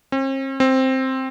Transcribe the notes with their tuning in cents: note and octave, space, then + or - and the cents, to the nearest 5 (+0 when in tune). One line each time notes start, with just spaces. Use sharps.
C4 +45
C4 +5